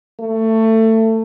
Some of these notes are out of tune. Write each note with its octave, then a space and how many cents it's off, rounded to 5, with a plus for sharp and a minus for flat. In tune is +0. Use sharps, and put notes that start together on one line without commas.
A3 +20